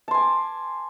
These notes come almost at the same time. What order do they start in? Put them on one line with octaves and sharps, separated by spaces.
A5 C6 G#5 D6